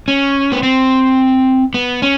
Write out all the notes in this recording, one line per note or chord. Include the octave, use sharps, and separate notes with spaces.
C#4
B3
C4
B3
C#4